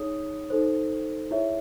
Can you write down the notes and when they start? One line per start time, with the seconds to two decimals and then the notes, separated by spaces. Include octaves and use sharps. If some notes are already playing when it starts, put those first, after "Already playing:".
Already playing: D#4 G#4 C#5 D#6
0.50 D#4 A4 C5
1.31 E4 G#4 C#5 E5